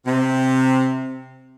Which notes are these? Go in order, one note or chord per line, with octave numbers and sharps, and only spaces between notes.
C3